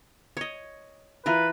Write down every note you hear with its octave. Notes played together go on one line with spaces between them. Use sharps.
C#5 D#5
E3 F4 A#4 B4